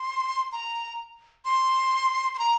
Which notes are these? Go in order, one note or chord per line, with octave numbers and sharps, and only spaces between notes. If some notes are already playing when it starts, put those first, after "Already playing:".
Already playing: C6
A#5
C6
C6
A#5